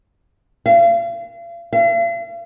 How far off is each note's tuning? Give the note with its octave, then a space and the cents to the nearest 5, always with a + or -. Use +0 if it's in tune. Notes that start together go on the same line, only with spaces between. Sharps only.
F5 -40
F5 -45